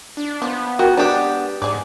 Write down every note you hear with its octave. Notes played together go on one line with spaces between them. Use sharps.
D4
F3 B3
F#4 A#4 G5
G#3 D4 G4 B4
G#2 G#4 D5